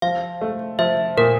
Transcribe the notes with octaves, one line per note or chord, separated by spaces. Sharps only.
F3 F5
A3
F3 E5
A#2 A#4